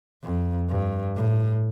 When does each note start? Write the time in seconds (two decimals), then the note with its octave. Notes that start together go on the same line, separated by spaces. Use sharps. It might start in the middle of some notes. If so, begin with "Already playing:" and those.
0.24 F2
0.70 G2
1.16 A2